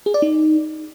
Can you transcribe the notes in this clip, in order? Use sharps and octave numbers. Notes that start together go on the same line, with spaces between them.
G#4
D5
D#4